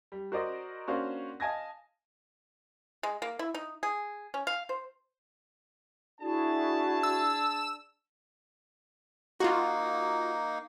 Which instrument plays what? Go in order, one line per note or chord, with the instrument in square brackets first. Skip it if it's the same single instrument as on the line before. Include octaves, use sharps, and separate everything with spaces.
[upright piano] G3
F#4 A#4 C5 D5 D#5
A#3 C#4 D4 F#4 C5 F5
D#5 F5 G#5 A5 G#6 A#6
[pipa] G#3
A#3
E4
D#4
G#4
C#4
F5
C5
[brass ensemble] D4 G#4 A5 [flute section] E4 F#4
[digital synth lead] E6
[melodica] A#3 D#4 [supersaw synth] F4 F#4